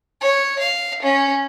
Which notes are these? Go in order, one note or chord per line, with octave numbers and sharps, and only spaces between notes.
C#5
F5
C#4